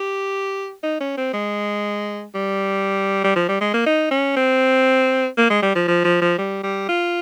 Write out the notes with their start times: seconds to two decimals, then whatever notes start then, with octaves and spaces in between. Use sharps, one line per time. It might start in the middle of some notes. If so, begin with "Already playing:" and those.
Already playing: G4
0.83 D#4
1.00 C#4
1.17 C4
1.33 G#3
2.35 G3
3.24 G3
3.36 F3
3.48 G3
3.61 G#3
3.73 A#3
3.86 D#4
4.11 C#4
4.36 C4
5.38 A#3
5.50 G#3
5.62 G3
5.75 F3
5.88 F3
6.04 F3
6.21 F3
6.38 G3
6.63 G3
6.89 F4